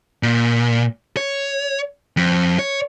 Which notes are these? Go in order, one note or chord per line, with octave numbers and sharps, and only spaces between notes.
A#2
C#5
F2
C#5